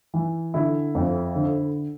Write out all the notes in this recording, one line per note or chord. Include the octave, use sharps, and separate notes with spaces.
E3
D3 E4
F2
D3